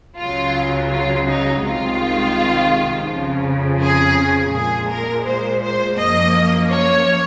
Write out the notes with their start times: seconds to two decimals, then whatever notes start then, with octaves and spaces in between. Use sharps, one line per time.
0.19 C#2 C#3 F#3 F4
0.91 F4
1.28 D#4
1.64 C2 C3 D#3 G#3 F4
3.09 F2 C#3 F3
3.81 G#4
4.53 A#2 G#3 G#4
4.90 A#4
5.26 C5
5.63 C5
5.99 F#2 F3 A#3 D#5
6.72 C#5